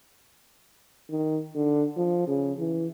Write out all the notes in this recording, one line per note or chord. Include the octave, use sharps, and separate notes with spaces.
D#3
D3
F3
C#3
E3